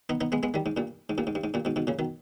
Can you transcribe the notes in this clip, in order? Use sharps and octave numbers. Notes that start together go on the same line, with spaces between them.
B3 D#4
B3 D#4
G#3 B3
G#3 B3
D#3 G3
G#2
G2 A#2
G#2
G2 A#2
G#2
G2
G#2
G2 A#2
G#2 B2
G#2 B2
A#2 C#3
B2 D#3